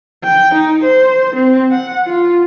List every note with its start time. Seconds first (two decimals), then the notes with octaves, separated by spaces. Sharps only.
0.24 G5
0.54 D#4
0.84 C5
1.35 C4
1.71 F#5
2.07 F4